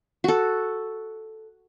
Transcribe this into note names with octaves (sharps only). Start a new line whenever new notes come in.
F#4 A4